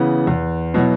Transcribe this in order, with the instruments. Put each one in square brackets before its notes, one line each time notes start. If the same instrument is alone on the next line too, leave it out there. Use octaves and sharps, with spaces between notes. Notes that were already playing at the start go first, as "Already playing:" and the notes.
Already playing: [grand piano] C#3 E3 B3
E2
B2 F#3 B3 E4